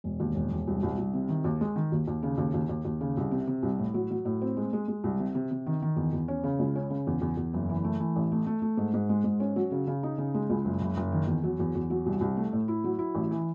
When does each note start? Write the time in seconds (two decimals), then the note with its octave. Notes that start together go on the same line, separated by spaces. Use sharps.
0.04 E1
0.20 D#2
0.35 E1
0.52 E1
0.67 C2
0.83 C2
0.98 C2
1.13 C3
1.29 D#3
1.44 D#2
1.61 G#3
1.76 D#3
1.92 D#2
2.07 D#2
2.23 C#3
2.38 D#2
2.54 D#2
2.69 D#2
2.85 D#2
3.01 C#3
3.17 C2
3.31 C3
3.47 C3
3.63 C2
3.79 A2
3.94 F#3
4.10 F#3
4.25 A2
4.41 C4
4.57 G#3
4.73 G#3
4.88 G#3
5.04 C2
5.19 C3
5.35 C3
5.51 C3
5.67 D#3
5.82 D#3
5.97 E2
6.13 E2
6.28 C#4
6.44 C#3
6.59 C#2
6.75 C#4
6.90 C#3
7.07 E2
7.21 E2
7.37 E2
7.54 F#1
7.69 E3
7.84 A3
8.00 E3
8.16 A1
8.32 A3
8.46 A3
8.62 A3
8.77 G#2
8.94 G#2
9.09 G#3
9.24 G#2
9.40 C#4
9.56 F#3
9.72 C#3
9.87 C#3
10.03 D#4
10.18 C#3
10.34 G#3
10.50 C#2
10.65 F#1
10.81 F#1
10.97 F#1
11.12 D#3
11.27 E2
11.43 F#3
11.59 E2
11.75 E2
11.90 F#3
12.06 C2
12.21 C2
12.37 A3
12.53 A2
12.68 E4
12.84 F#3
12.99 E4
13.15 A1
13.31 E3